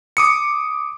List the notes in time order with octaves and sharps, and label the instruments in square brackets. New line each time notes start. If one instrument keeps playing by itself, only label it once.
[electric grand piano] D6 D#6 C#7